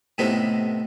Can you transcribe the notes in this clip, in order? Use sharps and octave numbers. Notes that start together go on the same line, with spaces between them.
A2 C3 A3 B3 D#4